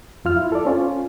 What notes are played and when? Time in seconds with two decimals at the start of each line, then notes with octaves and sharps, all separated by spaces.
0.25 F2 F4 F6
0.36 E4
0.52 A4 D5
0.65 C4 C#4 F4